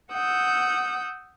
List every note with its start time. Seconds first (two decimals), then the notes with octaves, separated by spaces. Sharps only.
0.12 F#5 D#6 E6 G6